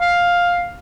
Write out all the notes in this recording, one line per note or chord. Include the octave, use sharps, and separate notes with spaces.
F5